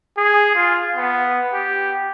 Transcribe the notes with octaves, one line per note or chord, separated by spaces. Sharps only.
G#4
F4
B3
G4